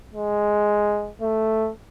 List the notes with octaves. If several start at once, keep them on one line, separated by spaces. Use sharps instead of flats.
G#3
A3